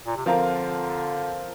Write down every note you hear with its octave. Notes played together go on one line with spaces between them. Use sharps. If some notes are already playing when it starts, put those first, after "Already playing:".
A#2
C3
D3 F3 C4 F4 A#4